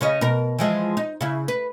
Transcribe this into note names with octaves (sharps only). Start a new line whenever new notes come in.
C#3 C#4 D#5
B2 A#4
E3 F3 G#3
D#4
C#3 E4
B4